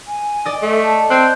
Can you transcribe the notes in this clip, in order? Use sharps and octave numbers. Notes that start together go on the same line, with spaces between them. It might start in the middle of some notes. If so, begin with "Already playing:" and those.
G#5
D5 D#5
A3 A4
A5
C4 F#6 G6